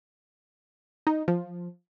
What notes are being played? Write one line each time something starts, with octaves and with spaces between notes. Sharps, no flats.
D#4
F3